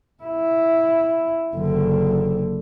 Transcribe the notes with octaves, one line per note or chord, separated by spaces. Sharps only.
E4
F#1 D3